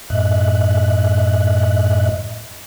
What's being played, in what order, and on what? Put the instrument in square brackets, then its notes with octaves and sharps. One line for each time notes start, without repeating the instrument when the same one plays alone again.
[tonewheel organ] F#2 A2 D#5 E5 F#6